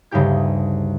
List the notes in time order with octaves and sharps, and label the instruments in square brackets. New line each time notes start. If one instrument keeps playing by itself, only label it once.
[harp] D2 G2 C#3 D#4 G4 G6